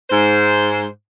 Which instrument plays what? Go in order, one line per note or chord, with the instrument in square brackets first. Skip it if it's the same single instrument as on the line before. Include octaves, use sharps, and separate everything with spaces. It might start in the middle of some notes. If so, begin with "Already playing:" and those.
[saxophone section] G#2 C5